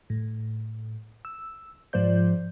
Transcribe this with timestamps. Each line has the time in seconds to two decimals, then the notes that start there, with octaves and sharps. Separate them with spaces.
0.10 A2
1.25 E6
1.93 G#2 F3 C5 D5 G6